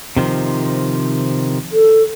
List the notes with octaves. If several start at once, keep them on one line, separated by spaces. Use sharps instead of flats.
C3 D#3 F3
A4